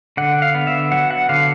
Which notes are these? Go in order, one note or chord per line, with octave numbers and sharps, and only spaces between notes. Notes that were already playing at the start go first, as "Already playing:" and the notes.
D3 F#5
F5
B3
E5
F#3 F#5
F#5
D3 F5